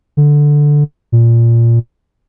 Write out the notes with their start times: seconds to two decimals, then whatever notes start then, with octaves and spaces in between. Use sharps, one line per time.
0.17 D3
1.12 A#2